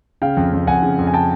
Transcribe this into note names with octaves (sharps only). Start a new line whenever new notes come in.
C#3 F5 G5
F2
F2
F2 F#5 G#5
C#3
F2
G#5
G5 A5